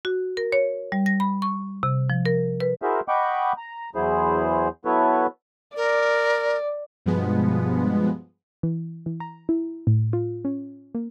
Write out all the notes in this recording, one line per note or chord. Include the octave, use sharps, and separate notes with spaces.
F#4
A#4
C#5
G3
A#6
B5
C#6
C3
F3
A#4
B4
E4 F#4 G#4 A#4 C5 E5
D#5 F#5 G5 B5 C#6 D6
A#5
E2 F#3 E4 G#4 C5
F#3 B3 E4 A4 B4 C#5
A#4 D5
G2 B2 F3 G#3 B3
E3
E3
A#5
E4
A2
F4
C#4
A#3